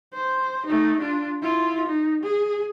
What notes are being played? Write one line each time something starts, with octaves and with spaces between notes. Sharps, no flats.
C5
A3 D#4
D4 F4
E4 F4
D#4
G#4